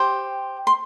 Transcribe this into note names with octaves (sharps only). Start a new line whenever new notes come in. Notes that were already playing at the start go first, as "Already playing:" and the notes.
Already playing: G4 C5 G5
C6